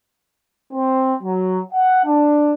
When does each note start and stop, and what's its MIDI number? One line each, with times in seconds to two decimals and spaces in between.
0.74 1.16 60
1.23 1.61 54
1.73 2.04 78
2.06 2.52 62